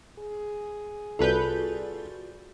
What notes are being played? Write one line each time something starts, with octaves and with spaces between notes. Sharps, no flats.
G#4
C2 F4 F#4 A4 B4 D5 G6